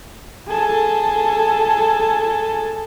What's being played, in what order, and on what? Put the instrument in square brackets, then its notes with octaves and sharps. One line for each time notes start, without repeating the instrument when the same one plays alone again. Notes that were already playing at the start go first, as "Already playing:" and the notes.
[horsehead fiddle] G#4 A4